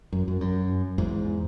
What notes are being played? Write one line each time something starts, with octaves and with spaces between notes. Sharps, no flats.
F#2
F#2
F#2
E2 G#2